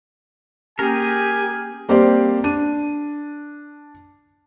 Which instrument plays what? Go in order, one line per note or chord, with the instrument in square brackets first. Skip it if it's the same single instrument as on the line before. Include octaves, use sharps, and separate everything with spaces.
[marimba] A#3 C#4 [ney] G4 [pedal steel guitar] G#4 A#4 [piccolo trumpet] G#5
[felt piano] G3 A#3 C4 G4 C5 D5
D4 D#7